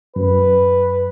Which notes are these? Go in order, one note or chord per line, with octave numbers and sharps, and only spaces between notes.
F#2 B4